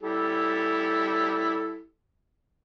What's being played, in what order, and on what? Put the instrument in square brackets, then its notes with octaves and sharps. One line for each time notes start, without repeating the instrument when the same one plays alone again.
[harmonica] G3 E4 A4